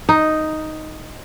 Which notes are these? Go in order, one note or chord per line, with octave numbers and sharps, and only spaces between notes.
D#4